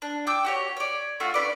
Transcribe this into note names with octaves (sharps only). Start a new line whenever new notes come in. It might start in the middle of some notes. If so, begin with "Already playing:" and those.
D4
G5 D6 E6 G6
F#4 G4 C#5
C#5 D5
A3 F4 F#4
C#4 F4 B4 D5